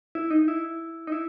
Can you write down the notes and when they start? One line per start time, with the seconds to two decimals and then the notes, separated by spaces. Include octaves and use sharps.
0.15 E4
0.30 D#4
0.48 E4
1.07 D#4
1.12 E4